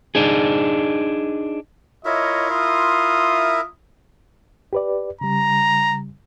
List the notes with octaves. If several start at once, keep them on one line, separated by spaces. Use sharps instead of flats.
D4 D#4 G#4
E4 F4 A#4 C#5 D#5 E5
F4 C6 D#6
G4 B4 D5
C#3 G3 A#5